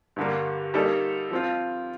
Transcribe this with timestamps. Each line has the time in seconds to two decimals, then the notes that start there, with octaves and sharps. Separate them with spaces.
0.16 G2 D3 G3 A#3
0.74 G3 A#3 D#4 A4
1.31 F3 C4 F4